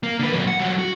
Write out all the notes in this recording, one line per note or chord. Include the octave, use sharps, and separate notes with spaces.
A#3
D3 B4
A#2 F#3
F#5
E3 F#3
F#4